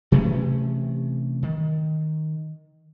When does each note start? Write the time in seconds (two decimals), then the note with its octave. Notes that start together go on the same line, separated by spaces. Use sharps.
0.12 C3 E3 A3 C#4
1.43 D#3